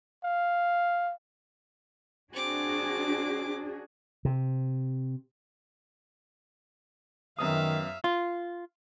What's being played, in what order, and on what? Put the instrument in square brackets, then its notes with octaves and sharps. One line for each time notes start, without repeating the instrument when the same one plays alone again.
[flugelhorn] F5
[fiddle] C4 D6 [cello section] D4 F#4 G#4
[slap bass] C3
[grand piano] F#2 B3 D#6 [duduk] D#3 [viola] E5 F5
[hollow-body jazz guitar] F4